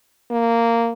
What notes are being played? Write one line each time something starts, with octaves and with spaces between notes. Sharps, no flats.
A#3